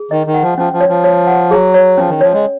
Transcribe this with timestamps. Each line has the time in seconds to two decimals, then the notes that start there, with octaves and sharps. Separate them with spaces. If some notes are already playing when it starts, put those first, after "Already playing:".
Already playing: G#4
0.11 D#3 D#5
0.27 D#3
0.34 F#5
0.42 F3
0.58 F3 C#4
0.73 F3
0.81 C#5
0.89 F3
1.04 C#5
1.27 F#5
1.51 F#3 G#4
1.74 C#5
1.98 F3 C#4
2.09 D#3
2.21 F3 C#5
2.33 G#3